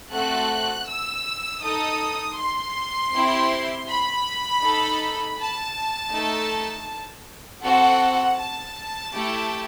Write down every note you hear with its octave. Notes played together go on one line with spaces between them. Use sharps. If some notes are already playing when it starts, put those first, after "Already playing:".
A3 C4 F#4 A4 F#6
E6
D#4 A4 D#6
C6
C4 E4 G4
B5
D#4 A4
A5
A3 D#4 A4
C4 F#4 A4 F#5
A5
A3 E4 G4